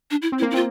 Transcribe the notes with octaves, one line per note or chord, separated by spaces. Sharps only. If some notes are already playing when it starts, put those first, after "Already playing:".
D4
E4
C4
E4
A#3
E4
C4 F4